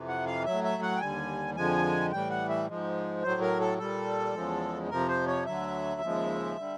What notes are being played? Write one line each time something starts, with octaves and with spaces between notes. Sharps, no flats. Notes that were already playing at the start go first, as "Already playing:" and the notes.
Already playing: F2 C3 E3
F#5
F5
A2 F#3 E5
E5
F#5
G5
D#2 D3 G3 G#5
F2 D3 F3 G#3 G#5
A2 E3 G3 G5
F#5
E5
G#2 F3 G#3
A2 F#3 C5
A#4
A4
A#2 G3 A4
E2 C#3 F3 G#3
F2 C3 F3 A#4
C5
C#5
D2 D3 F#3 E5
D#2 C#3 F3 G#3
D3 G3